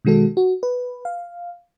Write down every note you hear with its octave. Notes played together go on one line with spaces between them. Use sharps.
B2 D#3 G#3 F#4 A4
F#4
B4
F5